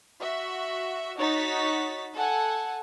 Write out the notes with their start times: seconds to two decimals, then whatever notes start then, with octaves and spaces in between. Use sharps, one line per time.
0.21 F#4 E5
1.18 D#4 F#4 C#5 A6 B6
2.16 A4 F#5 G#5